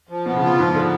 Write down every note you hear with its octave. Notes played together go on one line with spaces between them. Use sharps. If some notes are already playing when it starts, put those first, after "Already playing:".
F3
B2 B3
C#3
B2 F4
G#2 F3
D3 B3